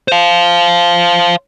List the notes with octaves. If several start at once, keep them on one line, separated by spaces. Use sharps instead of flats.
C5 F5